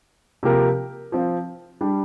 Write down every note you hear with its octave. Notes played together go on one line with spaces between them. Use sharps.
C3 F3 A#3 G4 A#4
F3 C4 F4
G3 D4 G4